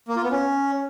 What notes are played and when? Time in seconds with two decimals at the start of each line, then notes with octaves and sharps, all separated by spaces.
0.08 A#3
0.16 F4
0.24 B3
0.31 C#4